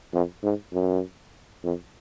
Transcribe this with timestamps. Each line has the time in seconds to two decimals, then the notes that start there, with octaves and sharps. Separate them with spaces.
0.13 F2
0.43 G#2
0.73 F#2
1.64 F2